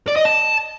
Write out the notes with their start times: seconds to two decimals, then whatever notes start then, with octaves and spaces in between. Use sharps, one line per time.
0.07 D5
0.16 D#5
0.25 A5